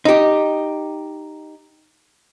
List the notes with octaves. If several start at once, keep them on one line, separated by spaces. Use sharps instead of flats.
D#4 G4